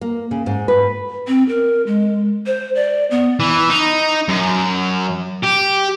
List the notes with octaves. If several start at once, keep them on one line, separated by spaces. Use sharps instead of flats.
A#3
C#3
G#2
B4
C4
A#4
G#3
C5
D5
B3
E3
D#4
F#2
G4